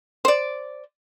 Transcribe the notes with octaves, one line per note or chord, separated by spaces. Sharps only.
C5 D5